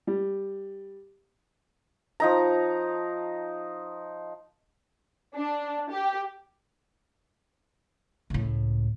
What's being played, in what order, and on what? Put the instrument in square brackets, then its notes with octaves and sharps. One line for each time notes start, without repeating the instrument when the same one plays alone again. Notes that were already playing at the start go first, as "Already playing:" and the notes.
[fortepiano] G3
[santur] F3 D#4 A#5
[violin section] D4
G4
[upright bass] C#2 A2